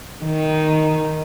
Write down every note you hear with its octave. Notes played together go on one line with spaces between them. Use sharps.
D#3